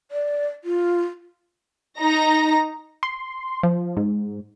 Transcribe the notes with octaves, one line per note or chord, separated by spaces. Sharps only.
D5
F4
D#4 A#5 A#6
C6
F3
G#2